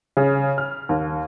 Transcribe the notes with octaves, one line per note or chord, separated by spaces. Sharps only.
C#3
F6
D#2